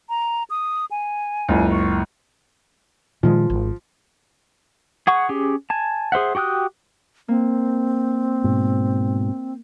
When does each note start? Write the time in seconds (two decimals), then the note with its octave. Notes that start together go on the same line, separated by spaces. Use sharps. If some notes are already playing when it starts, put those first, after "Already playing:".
0.09 A#5
0.50 D#6
0.91 G#5
1.48 F#1 C#2
1.71 C#6
3.23 A#2 D#3 F3 G#3
3.50 G#1
5.07 G#4 F#5 C#6
5.29 C#4 G4 G#4
5.70 G#5 A5
6.12 G#4 C5 E5 F#5
6.35 F#4 G4 G5 D#6 F#6
7.28 A#3 C4
8.44 G#2 B2